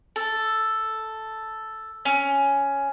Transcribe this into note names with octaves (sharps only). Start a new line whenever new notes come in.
A4
C#4